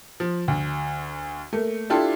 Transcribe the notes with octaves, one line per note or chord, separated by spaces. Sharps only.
F3
D2
A3 A#3
D4 E4 F4 G4 A4